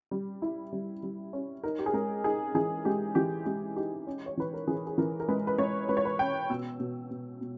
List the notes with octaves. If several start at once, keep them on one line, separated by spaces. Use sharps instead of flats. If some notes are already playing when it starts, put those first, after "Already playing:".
G3
E4
G3
G3
C#4
D#4 A#4
G4
G#4
G#3 A#4
D#4 G#4
E3 G#4
G#3 G4
E3 G4
G#3 G4
D#4 G4
C#4
C#5
E3 B4
A#4
E3 G#4
G#4
E3 A#4
A#4
G#3 B4
B4
G#3 C#5
G#3 B4
C#5
B4
C#4 G5
B2 E6
B2
B2
B2